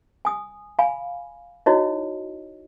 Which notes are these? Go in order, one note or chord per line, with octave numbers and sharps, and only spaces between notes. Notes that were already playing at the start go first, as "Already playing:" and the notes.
G#5 D#6
F5 G#5 B5
D#4 E4 F#4 C#5 D#5